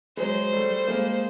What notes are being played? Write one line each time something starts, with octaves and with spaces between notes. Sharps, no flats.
F#3 G#3 C5
G3 A3
G#3 A#3